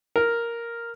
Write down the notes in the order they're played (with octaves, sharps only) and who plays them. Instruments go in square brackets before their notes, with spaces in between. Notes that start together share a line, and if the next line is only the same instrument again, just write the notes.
[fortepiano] A#4